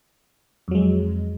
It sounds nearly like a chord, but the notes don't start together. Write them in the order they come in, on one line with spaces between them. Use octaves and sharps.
F2 F#3 G#3